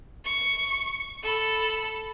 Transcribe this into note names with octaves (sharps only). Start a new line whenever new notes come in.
C#6
A4 B5